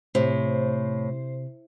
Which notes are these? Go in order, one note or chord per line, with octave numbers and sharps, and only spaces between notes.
A2 C3 C5